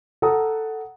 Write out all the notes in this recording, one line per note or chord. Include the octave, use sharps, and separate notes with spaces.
A4 F#5 A#5 D#6